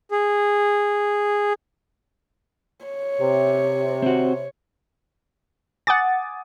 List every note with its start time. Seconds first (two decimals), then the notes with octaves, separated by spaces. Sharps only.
0.11 G#4
2.86 C#5
3.20 C3
4.02 C4 F#4
5.87 F#5 G#5 D6 D#6 A6